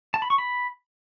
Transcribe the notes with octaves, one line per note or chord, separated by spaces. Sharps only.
A5
B5
C#6
B5